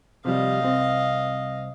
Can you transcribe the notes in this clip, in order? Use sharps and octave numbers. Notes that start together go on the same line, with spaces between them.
C3 F3 G3 D#5 F5
C2 C4